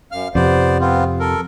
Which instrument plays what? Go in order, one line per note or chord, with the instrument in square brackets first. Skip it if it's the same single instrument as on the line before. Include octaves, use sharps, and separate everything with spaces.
[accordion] F#2 F5 F6
[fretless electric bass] F2 C3 [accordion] B3 C5 D5
[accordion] B3 C4 F4
A4 A#4